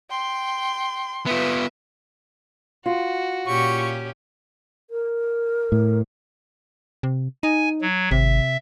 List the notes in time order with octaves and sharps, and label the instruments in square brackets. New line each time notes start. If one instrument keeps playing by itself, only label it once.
[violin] G5 [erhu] C6
[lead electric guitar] B3 F4 [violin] B4 E5
[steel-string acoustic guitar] F4 [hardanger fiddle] F#4
[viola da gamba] A#2 C#4 G4 [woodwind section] C#6
[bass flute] A#4
[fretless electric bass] A2
[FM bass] C3
[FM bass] D#4 [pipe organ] G#5
[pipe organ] F#3
[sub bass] G#1 [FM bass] C3 [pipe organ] E5